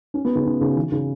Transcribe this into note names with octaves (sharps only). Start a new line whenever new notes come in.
C#4
B3
C#3
C#3
C#3
E3
C#3